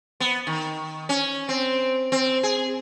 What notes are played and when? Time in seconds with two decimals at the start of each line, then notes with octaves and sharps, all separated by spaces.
0.20 B3
0.47 D#3
1.09 C#4
1.49 C4
2.12 C4
2.43 G#4